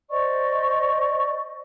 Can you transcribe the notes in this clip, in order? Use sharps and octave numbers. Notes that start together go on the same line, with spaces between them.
C5 D5 D#5 C#6